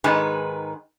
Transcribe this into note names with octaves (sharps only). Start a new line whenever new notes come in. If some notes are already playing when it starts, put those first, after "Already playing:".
G#2 D#3 G#3 D#4 B4 G#5